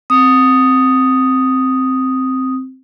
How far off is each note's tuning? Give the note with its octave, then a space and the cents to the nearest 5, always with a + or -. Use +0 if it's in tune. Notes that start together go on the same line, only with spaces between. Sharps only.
C4 +0 D#6 +0